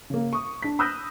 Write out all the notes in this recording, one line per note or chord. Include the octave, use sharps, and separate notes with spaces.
C#3 A#3
C#6 D#6
D4 B6
B5 D#6 E6 F#6 G6 A#6